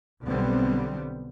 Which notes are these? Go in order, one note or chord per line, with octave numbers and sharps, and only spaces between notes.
B1 D3 G3 B3 C4